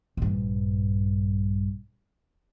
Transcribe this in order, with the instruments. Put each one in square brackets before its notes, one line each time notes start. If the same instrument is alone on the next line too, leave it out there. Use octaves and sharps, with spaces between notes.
[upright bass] A#1 G2